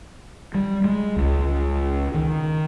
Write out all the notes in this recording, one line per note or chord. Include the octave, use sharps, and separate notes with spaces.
G3
G#3
C#2
D#3